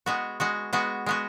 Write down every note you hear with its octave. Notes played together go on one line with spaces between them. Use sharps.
G#3 B3 F#4
G#3 B3 F#4
G#3 B3 F#4
G#3 B3 F#4